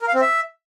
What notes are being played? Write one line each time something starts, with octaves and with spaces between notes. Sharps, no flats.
A#4
F5
C4
E5